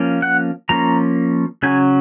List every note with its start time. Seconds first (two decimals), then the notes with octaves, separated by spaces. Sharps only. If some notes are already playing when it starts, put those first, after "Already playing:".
Already playing: F3 A#3 C#4
0.22 F#5
0.69 F3 A#3 C#4 A#5
1.63 C#3 F#3 C#4 G#5